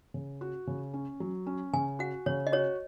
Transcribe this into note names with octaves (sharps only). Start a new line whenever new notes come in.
C#3
F#4
C#3
C#4
F#3
C#4
C#3 G#5
F#4 F#5
C#3 C#5
D#5
F#4 C#5